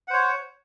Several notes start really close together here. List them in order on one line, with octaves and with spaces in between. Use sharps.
F#5 C5 C#5